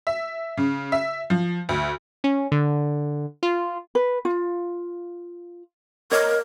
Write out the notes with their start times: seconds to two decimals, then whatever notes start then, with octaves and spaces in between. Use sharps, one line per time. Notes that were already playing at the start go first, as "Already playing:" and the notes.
0.07 E5
0.57 C#3
0.92 E5
1.30 F3
1.69 D2
2.24 C#4
2.52 D3
3.43 F4
3.95 B4
4.25 F4
6.12 A#4 C#5 D#5